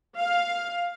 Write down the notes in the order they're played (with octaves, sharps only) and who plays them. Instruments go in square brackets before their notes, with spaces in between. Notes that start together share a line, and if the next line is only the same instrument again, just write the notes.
[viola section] F5